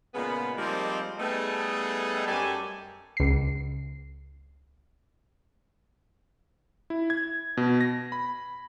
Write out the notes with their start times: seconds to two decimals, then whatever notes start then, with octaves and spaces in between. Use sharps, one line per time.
0.15 A#2 C#3 G#3 B3
0.58 F3 G3 G#3 A#3 C4 D#4
1.19 G3 A3 B3 D#4 G#4 A4
2.28 F#2 G3 G4 A4 G#5
3.17 C#2 C7
6.90 E4
7.10 G#6
7.57 B2
7.81 A#6
8.12 B5